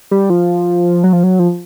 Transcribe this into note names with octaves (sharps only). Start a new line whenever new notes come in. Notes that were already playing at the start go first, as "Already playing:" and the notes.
G3
F3
F#3
F3
F#3
F3